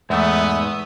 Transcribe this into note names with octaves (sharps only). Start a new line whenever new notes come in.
E2 G#2 A3 B3 E5 D#6